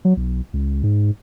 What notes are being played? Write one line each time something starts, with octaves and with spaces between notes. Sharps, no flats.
F#3
B1
C#2
G#2